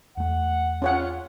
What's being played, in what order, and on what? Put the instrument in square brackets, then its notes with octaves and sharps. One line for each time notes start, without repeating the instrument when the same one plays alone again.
[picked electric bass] E2 A3 [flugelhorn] F#5
[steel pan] C#4 C#5 F#5 [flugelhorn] F4